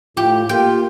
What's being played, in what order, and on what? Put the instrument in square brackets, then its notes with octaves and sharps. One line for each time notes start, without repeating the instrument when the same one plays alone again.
[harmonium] A2 [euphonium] F4 [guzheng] G4
[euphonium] A#3 [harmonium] F4 G4 [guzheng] G5